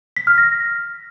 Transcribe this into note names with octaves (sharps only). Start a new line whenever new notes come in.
B6
F6
A#6